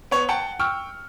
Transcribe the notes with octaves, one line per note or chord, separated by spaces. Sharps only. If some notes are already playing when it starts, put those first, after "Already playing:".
B3 C#5 C#6
F#5 G5 A5 C#7
G5 C#6 E6 F6